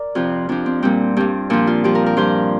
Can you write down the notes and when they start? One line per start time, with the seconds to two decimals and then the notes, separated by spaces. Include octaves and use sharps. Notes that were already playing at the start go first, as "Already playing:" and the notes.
Already playing: A#4 D5
0.15 F2 C3 F3 F4
0.49 F2 F3 D4
0.66 C4
0.83 A#2 G3 C4
1.17 G2 G3 C4
1.50 A#2 F3 D4
1.67 F4
1.84 G2 F3 G4
1.95 A#4
2.06 A#4
2.17 G2 F3 C5